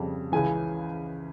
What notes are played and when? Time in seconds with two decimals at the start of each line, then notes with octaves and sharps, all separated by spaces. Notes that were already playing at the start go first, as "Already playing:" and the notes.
Already playing: F2 C#3 G3
0.32 C#2 C#3 E3 G#5